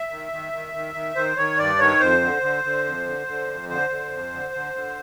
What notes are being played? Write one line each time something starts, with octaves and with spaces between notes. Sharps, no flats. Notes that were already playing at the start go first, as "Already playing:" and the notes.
Already playing: E5
D#3
D#3
D#3
D#3
D#3
D#3 C5
D#3 C#5
G2 D5
D#3 C#5
F2 C5
D3
D3
D3
F2
D3
D3
F2
D3 C5
D3
F2
D3
D3
D3